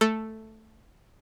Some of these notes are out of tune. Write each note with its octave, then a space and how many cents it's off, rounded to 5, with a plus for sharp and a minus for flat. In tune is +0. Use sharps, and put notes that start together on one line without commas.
A3 +0 A4 +5